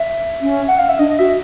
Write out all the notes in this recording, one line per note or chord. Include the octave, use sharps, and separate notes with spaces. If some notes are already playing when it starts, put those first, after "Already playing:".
Already playing: E5
C#4
F#5
F5
E5
D4 D#5
D#5
F#4 E5